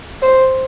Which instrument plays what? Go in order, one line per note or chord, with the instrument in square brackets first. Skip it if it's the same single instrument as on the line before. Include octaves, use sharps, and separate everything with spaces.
[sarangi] C5